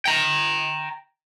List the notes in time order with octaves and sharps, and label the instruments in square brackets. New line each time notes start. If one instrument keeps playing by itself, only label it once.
[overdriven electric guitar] G5 A#5